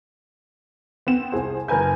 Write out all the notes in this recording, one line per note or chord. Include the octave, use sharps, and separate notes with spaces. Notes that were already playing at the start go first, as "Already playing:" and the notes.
B3 C4 E7
C2 G#4 C5
F#1 A#4 B4 G#5 G6